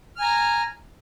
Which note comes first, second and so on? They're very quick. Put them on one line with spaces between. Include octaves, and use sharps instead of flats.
F6 G#5 A#5